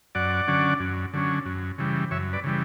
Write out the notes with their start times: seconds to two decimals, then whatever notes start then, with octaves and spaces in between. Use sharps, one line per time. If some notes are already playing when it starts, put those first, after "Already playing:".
0.15 F#2 D5 F#5
0.48 D3 F#3 C#4
0.80 F#2
1.13 D3 F#3 C#4
1.46 F#2
1.78 C#3 E3 G3
2.11 F#2 C#5 E5
2.33 B4 D5
2.44 C#3 E3 G3